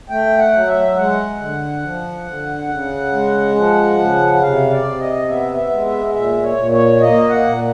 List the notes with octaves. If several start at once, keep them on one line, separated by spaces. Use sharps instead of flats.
A3 G5
F#5
F#3
E5
G#3 F#5
D3
F3
D3
C#3
G#3
F3
C#3
F#5
C3 F5
D5
C3
D#5
B3 E5
E5
G#3
E5
A#2 E5
C#5
A#2
C#5
A#3 D#5
F#5
A#2